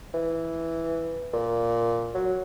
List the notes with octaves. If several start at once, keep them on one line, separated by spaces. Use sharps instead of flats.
E3
A#2
F#3